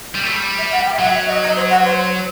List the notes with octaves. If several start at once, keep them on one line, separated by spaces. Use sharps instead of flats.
G3
A3
G3
E5
F#5
G5
E5
F#3 F#5
E5
D#5
D#5
C5
F#5
C5